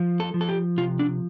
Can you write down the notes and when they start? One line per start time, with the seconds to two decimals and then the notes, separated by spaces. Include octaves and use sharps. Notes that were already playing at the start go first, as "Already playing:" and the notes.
Already playing: F3
0.20 A4
0.34 F3
0.41 A4
0.49 G4
0.77 C3 F4
0.99 D4